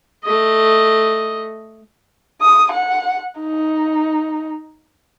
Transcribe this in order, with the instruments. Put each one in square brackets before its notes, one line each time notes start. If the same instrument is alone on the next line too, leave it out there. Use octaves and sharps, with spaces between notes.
[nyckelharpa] A3 D#5
[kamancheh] D#6
F#5
D#4